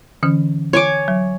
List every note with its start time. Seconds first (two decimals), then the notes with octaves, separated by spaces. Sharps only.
0.23 D3 E3 C#4
0.73 C#5 G#5 D6
1.08 F#3